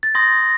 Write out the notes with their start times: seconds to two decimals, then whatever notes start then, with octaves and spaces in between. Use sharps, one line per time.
0.03 A6
0.15 C6 D#6 G6 A#6